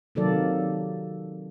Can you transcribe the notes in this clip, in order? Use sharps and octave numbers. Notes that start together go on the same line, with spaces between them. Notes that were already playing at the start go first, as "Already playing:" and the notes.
C3 D#3 F#3 A#3 A4 D5